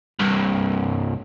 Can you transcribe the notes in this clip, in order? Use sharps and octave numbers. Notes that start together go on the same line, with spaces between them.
C2 G2